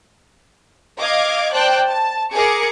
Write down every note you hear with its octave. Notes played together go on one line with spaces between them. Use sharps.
D#5 F5 D6 G#6
C5 D5 G5 A5 F#6
A5
G#4 A#4 D6 C#7